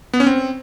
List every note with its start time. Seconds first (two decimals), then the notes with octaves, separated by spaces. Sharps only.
0.13 B3
0.20 C#4
0.27 C4